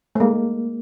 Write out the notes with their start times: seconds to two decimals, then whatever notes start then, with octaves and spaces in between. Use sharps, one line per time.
0.15 A3
0.20 G#3 A#3